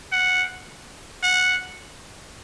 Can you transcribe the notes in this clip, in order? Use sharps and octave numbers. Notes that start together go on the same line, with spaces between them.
F#5
F#5